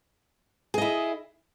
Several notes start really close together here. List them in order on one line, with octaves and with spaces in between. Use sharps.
G#4 D#5 E4